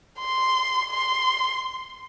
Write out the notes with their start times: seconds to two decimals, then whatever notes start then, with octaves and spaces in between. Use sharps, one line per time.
0.19 C6
0.90 C6